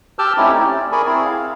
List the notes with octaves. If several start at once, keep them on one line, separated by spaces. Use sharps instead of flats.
G4 A5 D6 E6 F6 G6
A3 C4 C#4 D#4 E4 G4
D5
G#4 A#4 D5 G#5 B5 C#6
C4 E4 G#4
F5